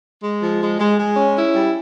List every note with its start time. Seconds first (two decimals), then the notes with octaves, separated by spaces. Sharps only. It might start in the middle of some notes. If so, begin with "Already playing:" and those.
0.23 G#3
0.42 F3
0.61 G#3
0.79 G#3
0.98 G#3
1.17 C#4
1.35 E4
1.54 G3